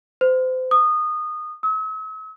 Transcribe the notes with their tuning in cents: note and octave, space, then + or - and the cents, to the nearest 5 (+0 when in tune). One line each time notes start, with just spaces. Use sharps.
C5 -30
D#6 -20
E6 -45